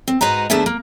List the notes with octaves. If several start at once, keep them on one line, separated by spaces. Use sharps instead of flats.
C4
G#2 F#4 B4 C5 D#5 A#5
D#2 A3 B3 D4 G#4 E5
A#3